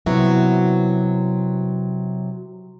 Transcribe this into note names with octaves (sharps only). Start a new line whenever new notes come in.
C3 F#3 B3 E4 F#4